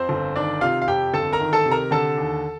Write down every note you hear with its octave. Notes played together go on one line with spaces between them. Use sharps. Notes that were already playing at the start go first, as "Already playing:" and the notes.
Already playing: F2 C4 C5
G1
D#3 D4 D5
C3 F4 F5
F5
F2 G4 G5
G1 A4 A5
A#4 A#5
D#3
A4 A5
C3
A#4 A#5
D3 A4 A5
D#2